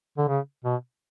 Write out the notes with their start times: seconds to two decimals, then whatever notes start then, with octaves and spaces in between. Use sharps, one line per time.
0.18 D3
0.28 C#3
0.64 B2